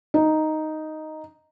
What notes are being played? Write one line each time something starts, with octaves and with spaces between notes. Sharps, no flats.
D#4